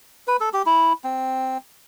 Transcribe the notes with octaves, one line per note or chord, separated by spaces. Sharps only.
B4
A4
G4
E4
C4